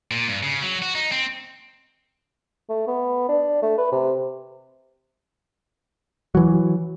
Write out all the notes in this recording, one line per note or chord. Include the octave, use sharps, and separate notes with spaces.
A#2
G2
C#3
F#3
F#4
D#4
C4
A3
B3
D4
A3
B4
C3
E3 F#3